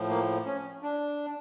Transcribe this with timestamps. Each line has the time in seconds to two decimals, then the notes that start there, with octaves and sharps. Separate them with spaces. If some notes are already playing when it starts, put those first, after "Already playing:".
Already playing: A2 F3
0.10 A#3
0.46 C#4
0.82 D4